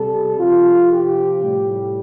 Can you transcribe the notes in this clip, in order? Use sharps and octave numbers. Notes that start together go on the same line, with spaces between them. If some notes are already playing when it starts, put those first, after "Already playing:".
Already playing: C3 G3 A4
C3 F3 F4
G4
A2 G3